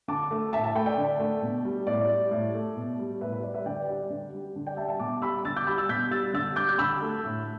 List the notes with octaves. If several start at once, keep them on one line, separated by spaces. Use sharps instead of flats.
D3 A5 D6
A3
A2 E5 A5
E5 A5
A3 G5 B5
D5 G5
D3
A3
B2
G3
A2 D5
G3
A2
A3
B2
G3
A2 B4 E5
B4
G3 D5
B4 E5
D3 D5 G5
G3 D5
D3
G3
D3
D5 G5
G3 E5 A5
E5 A5
B2 A5 D6
G3 B5 E6
D3 E6 A6
D6 G6
G3 B5 E6
E6 A6
B2 G6 B6
G3 E6 A6
D3 E6 A6
G3 D6 G6
G6
D3 B5 E6
A3
A2